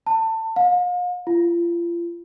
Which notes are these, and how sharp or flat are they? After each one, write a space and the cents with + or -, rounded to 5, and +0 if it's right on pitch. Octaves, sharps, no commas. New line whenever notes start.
A5 +25
F5 +40
F4 -35